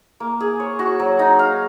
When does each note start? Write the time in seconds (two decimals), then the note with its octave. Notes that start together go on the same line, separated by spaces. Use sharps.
0.20 A#3
0.40 G#4
0.60 C#5
0.79 F#4
1.00 F#3
1.19 D#4
1.39 F5